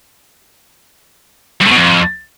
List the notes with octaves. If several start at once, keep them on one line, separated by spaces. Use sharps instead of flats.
G2
A2
B2
F2